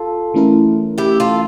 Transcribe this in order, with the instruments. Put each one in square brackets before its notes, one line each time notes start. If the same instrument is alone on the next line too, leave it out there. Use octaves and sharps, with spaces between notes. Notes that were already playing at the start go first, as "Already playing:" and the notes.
Already playing: [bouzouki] F4 A4
[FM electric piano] E3 A3 C#4 E4 A#4
[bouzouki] E4 G4
F4 A4